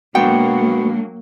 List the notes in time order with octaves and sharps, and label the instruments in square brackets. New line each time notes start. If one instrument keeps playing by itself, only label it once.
[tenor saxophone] B2 [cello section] F#3 A#3 [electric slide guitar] G#3 D4 F#5 [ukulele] G5